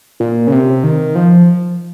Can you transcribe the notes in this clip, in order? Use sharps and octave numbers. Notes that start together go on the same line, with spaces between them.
A#2
C#3
C3
D#3
F3